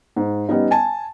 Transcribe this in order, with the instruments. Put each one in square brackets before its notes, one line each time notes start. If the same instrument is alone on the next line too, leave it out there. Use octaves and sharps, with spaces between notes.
[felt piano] G#2
G3 B3 C#4 D#4
G#5 A5